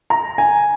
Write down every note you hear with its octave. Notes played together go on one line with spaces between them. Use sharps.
A#5
G#5